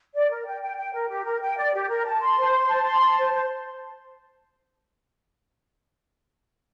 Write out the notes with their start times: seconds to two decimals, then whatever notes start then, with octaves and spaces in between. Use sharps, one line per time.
0.14 D5
0.30 A#4
0.46 G5
0.62 G5
0.77 G5
0.94 A#4
1.10 G4
1.25 A#4
1.42 G5
1.58 D5
1.74 G4
1.90 A#4
2.06 A5
2.21 C6
2.38 C5
2.53 C6
2.69 A5
2.85 C6
3.01 A5
3.17 C5
3.33 C5